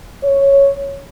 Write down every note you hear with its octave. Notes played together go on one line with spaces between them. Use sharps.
C#5